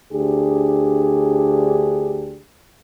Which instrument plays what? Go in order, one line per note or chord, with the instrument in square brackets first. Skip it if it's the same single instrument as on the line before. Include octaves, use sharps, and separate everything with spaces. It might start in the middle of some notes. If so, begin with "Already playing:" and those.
[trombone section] D2 D4 G4 G#4